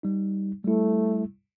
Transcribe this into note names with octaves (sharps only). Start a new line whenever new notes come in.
G3 D#4
G3 A3 E4